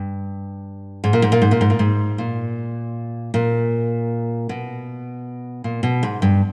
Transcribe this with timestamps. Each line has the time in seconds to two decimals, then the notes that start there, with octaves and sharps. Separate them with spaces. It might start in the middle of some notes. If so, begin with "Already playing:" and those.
Already playing: G2
1.04 G#2
1.13 A#2
1.22 G#2
1.32 A#2
1.42 G#2
1.51 A#2
1.61 G#2
1.70 A#2
1.79 G#2
2.18 A#2
3.34 A#2
4.49 B2
5.64 A#2
5.83 B2
6.03 G#2
6.22 G2